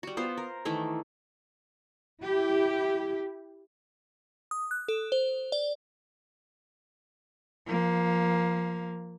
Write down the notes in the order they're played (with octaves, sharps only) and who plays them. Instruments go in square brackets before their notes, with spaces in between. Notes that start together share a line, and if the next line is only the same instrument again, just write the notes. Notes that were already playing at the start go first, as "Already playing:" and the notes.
[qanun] G3 F#4
B3 F4 C5
A#4
D#3 E3 A3 E4
[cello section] E4 G4
[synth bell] D#6
F#6
A4
C5
D5
[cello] F3 A#3